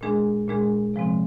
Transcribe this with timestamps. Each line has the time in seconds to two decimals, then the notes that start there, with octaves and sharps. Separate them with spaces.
0.01 A#2 G#3 D4 G#4
0.48 A#2 G#3 D4 G#4
0.94 C3 F3 G#3 C4